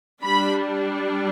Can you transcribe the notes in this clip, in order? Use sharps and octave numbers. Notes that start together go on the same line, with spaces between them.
G3 D4 B5